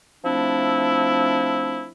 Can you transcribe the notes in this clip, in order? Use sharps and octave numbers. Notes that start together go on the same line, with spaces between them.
F3 A3 C4 D4 E4